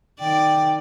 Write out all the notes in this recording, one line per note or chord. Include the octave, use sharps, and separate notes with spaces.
D#3 D5 G5